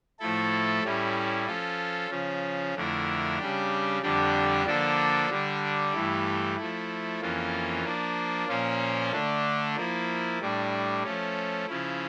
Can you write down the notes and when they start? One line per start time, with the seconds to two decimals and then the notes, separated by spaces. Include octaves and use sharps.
0.19 A2 F3 A3 E4 A4
0.84 A2 G3 C#4 E4
1.47 F3 C#4 F4 A4
2.10 C#3 F3 C#4
2.75 F2 D3 A3 E4 A#4
3.38 C#3 G3 D4 G4
4.02 F2 D3 G3 D4 G4
4.66 D3 F3 A#3 D4 A4
5.29 D3 G3 D4
5.93 G2 E3 A3 E4 G4
6.56 F3 A3 E4
7.20 F2 E3 A#3 C#4 F4
7.84 F3 A#3 D4
8.48 A#2 F3 A#3 C#4 F4
9.12 D3 A3 D4
9.76 F3 A#3 E4
10.40 A2 G3 D4
11.03 F3 A3 C#4
11.67 C#3 F3 C#4 E4